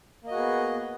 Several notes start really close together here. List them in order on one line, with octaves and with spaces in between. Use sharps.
A#3 D#5 F#4 G#4 B3